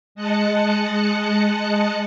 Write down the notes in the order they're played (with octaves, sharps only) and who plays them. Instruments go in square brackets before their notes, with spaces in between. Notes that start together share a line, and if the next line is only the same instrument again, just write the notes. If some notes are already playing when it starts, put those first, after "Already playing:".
[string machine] G#3 D#5 A5 F#6 C#7